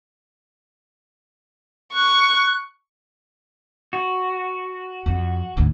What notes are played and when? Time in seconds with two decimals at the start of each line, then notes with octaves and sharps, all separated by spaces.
1.93 C#6 F#6
3.93 F#4
5.06 F2
5.57 D2 G#2